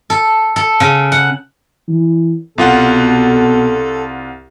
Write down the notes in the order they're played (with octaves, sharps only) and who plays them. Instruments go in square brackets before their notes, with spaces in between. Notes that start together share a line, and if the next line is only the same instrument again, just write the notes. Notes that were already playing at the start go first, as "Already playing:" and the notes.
[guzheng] A4
A4
C#3
F#5
[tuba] E3
[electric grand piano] C2 F4 F#5 [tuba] B2 [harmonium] A4